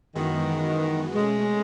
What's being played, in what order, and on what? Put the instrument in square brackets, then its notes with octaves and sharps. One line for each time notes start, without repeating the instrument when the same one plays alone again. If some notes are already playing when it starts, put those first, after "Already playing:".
[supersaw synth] F#2 E3 G#3 B3 F#4 [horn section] D#3
[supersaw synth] B2 A3 C#4 [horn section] G#3